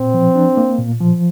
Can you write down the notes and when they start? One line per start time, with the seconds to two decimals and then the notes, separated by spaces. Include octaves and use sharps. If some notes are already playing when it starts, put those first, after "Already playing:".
Already playing: A#2 C4
0.14 F3
0.36 D4
0.57 A#3
0.79 A#2
1.00 F3